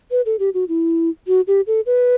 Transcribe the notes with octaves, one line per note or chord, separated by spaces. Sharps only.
B4
A4
G4
F#4
E4
F#4
G4
A4
B4